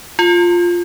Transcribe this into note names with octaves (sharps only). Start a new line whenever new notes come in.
F4